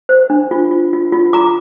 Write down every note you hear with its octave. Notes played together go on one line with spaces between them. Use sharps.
C5
D4
F4
F4
F4
F4
F4 A#5 D6